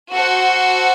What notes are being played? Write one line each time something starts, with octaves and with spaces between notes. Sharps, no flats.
F#4 A4 C5 F#5